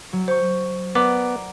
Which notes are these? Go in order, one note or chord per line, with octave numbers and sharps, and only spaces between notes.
F#3
C5 C#6 G6 C#7
B3 A#4 D5 F#5 D6